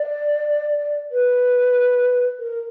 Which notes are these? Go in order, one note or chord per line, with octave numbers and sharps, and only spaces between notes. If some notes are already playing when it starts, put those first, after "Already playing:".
Already playing: D5
B4
A#4